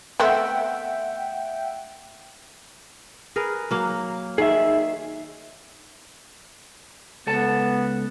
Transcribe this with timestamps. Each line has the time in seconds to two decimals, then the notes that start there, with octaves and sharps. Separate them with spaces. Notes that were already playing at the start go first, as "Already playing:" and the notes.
0.20 A3 B3 C4 E5 F#5 G5
3.36 G#4 A#4 B4
3.71 F#3 A#3
4.38 D#3 G#4 E5
7.27 C#2 B3 A4 A5